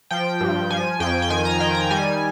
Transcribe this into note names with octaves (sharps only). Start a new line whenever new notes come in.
F3 G5
G2
F3 G#5
F2 G5
G5
D#3 G#5
A#5
D#3 G5
A#5
G3 G#5